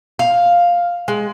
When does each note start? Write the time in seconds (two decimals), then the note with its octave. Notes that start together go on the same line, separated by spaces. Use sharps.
0.19 F5
1.08 G#3